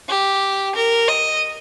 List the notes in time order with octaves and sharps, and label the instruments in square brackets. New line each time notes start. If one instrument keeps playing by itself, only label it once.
[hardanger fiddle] G4
A#4
D#5